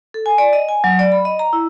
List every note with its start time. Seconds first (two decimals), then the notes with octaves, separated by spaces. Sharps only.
0.14 A4
0.26 G#5
0.38 D5
0.53 D#5
0.68 G#5
0.84 F#3
0.99 D5
1.12 B5
1.25 D#5
1.39 A#5
1.53 E4